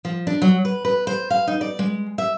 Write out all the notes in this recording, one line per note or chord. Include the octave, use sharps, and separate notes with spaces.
F3
D4
F#3
B4
B4
C5
F5
D#4
D5
G#3
E5